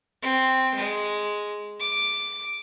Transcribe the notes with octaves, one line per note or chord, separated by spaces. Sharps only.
C4
G#3
D6